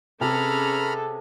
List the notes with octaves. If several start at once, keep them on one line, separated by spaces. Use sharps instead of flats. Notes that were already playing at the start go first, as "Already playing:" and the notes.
C3 C#4 G#4 A4 B4 A#5 B5 F6